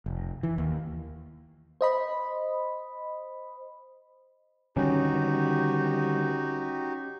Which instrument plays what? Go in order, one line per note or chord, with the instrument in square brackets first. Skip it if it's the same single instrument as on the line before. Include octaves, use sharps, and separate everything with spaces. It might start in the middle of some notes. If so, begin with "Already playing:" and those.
[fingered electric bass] F1
E3
D#2
[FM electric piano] C5 D#5 B5
[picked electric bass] D3 D#3 G3 [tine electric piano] C#4 [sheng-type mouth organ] D#4 F#4 G4